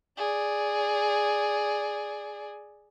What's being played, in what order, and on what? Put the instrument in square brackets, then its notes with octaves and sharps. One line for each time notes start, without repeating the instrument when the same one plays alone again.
[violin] G#4 D5